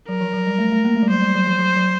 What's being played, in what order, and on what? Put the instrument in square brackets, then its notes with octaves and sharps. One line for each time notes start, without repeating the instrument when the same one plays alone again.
[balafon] F#3 [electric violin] A#4
[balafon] F3
F#3
G3
A3
A3
A#3
A3
G3
[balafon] F#3 [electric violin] C5
[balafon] G3
F#3
F3
F#3
F#3